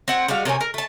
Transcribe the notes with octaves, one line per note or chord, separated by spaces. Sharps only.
C4 F#5 G#5
G3 G#3 F#4 F5
C3 A#3 C#5 G#5
A#4
A3 A5